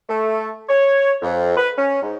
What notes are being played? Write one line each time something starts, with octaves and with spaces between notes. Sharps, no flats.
A3
C#5
F2
B4
C#4
G#2